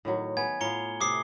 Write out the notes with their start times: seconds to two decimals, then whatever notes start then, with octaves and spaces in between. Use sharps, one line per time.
0.05 A2 D#3 F#3
0.37 B3 G#5 G#6
0.61 A2 F4 F5 A#5 C#7 G7
1.01 C3 A3 D6 D#6 C7